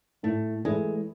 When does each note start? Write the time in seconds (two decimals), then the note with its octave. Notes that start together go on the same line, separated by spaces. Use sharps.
0.23 A2 A3
0.65 E3 G#3 A3 E4